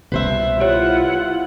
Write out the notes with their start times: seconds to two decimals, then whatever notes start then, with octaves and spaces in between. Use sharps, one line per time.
0.12 C2 B2 B4 C5 E5
0.60 E4 F4 G4 C#5 F#5